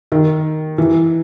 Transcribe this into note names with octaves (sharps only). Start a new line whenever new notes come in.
D#3
E3